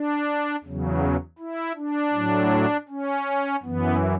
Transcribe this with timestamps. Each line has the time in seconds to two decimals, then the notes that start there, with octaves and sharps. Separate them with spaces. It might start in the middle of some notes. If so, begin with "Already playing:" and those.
Already playing: D4
0.64 E2 C#3 F#3
1.39 E4
1.76 D4
2.14 A2 F#3
2.89 C#4
3.63 F#2 E3 B3